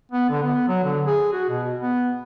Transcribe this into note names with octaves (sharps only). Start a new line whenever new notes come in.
B3
D3
B3
F#3
D3
G#4
F#4
B2
B3